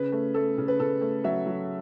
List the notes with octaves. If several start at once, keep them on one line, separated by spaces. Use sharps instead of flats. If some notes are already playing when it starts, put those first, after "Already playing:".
Already playing: C#3 B4
A3
A3 A4
C#3
B4
C#3 A4
A3
F#3 E5
F#3